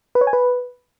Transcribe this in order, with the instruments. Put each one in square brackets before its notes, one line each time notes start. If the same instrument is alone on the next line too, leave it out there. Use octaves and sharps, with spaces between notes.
[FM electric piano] B4
C#5
G#5
B4